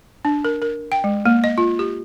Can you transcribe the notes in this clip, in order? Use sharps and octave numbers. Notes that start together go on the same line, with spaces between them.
D4
A#4
A#4
G5
G#3
A#3
D#5
F4
G4